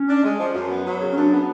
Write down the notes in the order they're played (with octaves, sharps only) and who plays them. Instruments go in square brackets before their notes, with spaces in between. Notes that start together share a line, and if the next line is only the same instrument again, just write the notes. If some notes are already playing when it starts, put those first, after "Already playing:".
Already playing: [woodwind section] C#4
[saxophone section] D4
G#3
F3
F#2
B3
F#3
C#3
[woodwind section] C#4
[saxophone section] F#2 [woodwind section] D4
[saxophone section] B3